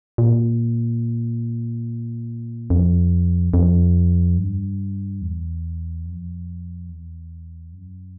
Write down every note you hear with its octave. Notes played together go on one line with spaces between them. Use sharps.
A#2
F2
F2
G2
E2
F2
E2
F#2